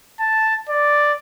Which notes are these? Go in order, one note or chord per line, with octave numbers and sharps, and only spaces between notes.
A5
D5